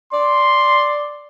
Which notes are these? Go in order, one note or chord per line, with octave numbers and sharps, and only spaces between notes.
D5 C6